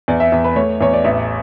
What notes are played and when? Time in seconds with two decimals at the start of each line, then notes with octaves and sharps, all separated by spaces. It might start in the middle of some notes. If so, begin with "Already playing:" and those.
0.08 E2 D5
0.20 E5
0.32 E2
0.44 B4
0.56 A3 C#5
0.81 E2 C#5
0.93 D5
1.04 A1 E5